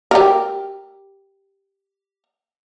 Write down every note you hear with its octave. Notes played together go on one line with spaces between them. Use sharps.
G4 A#4